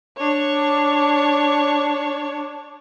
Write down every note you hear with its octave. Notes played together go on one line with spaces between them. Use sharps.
D4 C#5